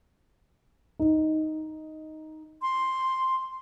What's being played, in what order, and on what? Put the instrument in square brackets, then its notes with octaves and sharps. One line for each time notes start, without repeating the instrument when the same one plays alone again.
[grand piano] D#4
[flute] C6